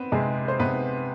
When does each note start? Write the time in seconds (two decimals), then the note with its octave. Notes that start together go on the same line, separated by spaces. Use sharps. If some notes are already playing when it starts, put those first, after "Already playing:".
Already playing: B3 C4 B4
0.12 C3 G#3 G#4
0.48 C5
0.59 C3 B3 B4